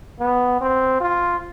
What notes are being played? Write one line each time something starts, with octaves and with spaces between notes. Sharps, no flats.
B3
C4
F4